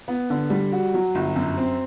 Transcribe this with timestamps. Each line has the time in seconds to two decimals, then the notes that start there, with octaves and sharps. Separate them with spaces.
0.08 B3
0.30 D3
0.50 G3
0.72 F#4
0.94 F#3
1.15 G1
1.36 F#2
1.58 C4